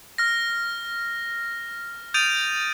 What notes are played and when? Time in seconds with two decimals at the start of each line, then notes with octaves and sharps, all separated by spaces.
0.18 F6 A#6
2.14 D#6 G6 A6 D7 D#7 F7